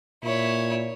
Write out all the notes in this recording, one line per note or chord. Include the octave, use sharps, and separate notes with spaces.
A#2 E4 C#5